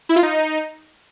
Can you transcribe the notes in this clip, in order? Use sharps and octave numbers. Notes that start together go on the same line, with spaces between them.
E4
F4
D#4